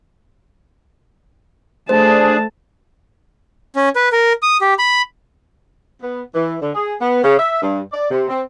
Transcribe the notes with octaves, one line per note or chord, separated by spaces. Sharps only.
A3 D4 G#4 C5 A5
C#4
B4
A#4
D#6
G4
B5
B3
E3
D3
G#4
B3
C#3
E5
G2
D5
C3
C4